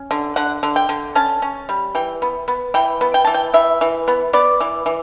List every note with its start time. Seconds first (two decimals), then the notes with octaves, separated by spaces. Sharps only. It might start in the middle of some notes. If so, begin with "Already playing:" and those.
Already playing: C#4
0.11 D3
0.36 D3 F#5
0.63 D3
0.76 G5
0.89 D3
1.15 C#4 A5
1.42 C#4
1.69 G3
1.95 E3 G5
2.22 B3
2.48 B3
2.74 E3 G5
3.01 B3
3.14 G5
3.25 E3 A5
3.34 G5
3.54 E3 E5
3.81 E3
4.08 B3
4.33 B3 D5
4.61 E3
4.86 E3